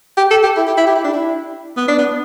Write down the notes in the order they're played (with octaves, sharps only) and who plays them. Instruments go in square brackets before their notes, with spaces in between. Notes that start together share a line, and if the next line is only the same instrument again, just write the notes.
[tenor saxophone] G4
A4
G4
E4
G4
E4
G4
E4
D4
E4
B3
D4
B3